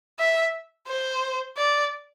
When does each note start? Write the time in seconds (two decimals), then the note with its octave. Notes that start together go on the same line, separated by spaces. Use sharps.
0.19 E5
0.88 C5
1.57 D5